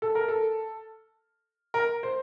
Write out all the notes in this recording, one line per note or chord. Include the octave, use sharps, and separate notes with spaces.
A4
A#4
A4
A#4
C5